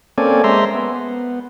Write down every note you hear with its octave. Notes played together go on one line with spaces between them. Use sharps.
A#3 C4 C#4 A4 D5 G#5
G#3 C5 E5 A#5 C6
B3